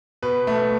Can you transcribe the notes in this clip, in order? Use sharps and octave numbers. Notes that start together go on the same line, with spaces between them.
B2 B4
A3